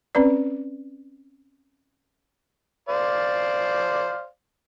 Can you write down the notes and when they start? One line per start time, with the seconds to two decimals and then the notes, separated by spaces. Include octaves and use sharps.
0.15 C4 C#4 B4 D5
2.89 C5 D5 F5